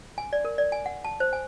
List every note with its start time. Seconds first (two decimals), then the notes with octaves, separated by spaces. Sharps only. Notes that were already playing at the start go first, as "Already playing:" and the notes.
0.18 G#5
0.33 D5
0.45 A#4
0.58 D5
0.72 G#5
0.86 F#5
1.04 A5
1.20 C5
1.33 G#5